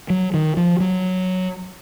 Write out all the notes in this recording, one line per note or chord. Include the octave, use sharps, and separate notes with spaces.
F#3
D#3
F3
F#3